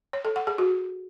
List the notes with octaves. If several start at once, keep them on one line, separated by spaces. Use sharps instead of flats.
C#5
A4
F#5
G#4
F#4